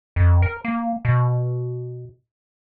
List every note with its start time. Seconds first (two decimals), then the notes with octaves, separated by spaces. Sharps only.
0.16 F2
0.42 A#4
0.65 A#3
1.05 B2